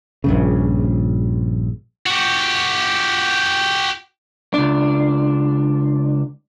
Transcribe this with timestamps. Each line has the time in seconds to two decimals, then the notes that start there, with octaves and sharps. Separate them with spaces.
0.24 A#1 G2 C#3
2.06 F#4 G4
4.54 C#2 D4